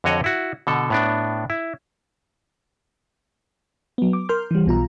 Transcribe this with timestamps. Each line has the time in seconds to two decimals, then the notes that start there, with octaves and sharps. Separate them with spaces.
0.04 F2 D3 F#4 C#5 D#5 F#5
0.24 E4 F#4
0.67 B2 D3 A4
0.90 A2 B3 D4
1.50 E4
3.98 F#3 B3
4.13 D6
4.29 A#4 C6 F6 G6
4.51 E3 G3
4.66 B1 B2 F4 A#5